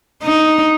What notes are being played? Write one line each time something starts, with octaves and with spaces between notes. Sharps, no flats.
D#4